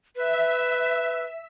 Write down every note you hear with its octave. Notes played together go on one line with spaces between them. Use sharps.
B4 E5